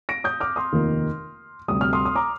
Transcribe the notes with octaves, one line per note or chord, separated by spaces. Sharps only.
A#6 D7
D#6 G6
D6 F6
C6 D#6
F1 D#2 D#3 A#3 F4
D2 C3 G3 D#6
F6
C6 D#6
D#6
A#5 D6